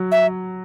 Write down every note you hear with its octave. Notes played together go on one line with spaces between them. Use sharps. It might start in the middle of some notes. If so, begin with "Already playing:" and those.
Already playing: F#3
E5